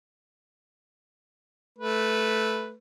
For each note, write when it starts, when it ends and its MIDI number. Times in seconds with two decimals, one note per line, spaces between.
1.79 2.73 57
1.79 2.73 71